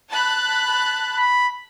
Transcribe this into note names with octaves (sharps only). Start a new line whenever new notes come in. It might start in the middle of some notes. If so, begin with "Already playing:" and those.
A5 B5 F#6
B5